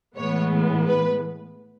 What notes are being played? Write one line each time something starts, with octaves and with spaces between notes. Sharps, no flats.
A2 E3 G#3 B3 C#5
B4